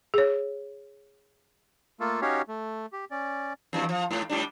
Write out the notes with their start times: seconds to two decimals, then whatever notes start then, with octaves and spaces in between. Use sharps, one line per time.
0.14 G#4 C#5
2.00 A3 A#3 F4 A4
2.22 C#4 D#4 F#4 G4 C#5 F5
2.48 A3
2.93 G4
3.11 C#4 D5
3.73 E2 G2 E3
3.89 F3
4.11 G#2
4.30 G#2 G3 D4